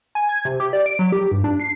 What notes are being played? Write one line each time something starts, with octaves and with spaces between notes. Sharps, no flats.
G#5
G#6
C3
G4
D5
D7
F#3
G4
G2
D4
C7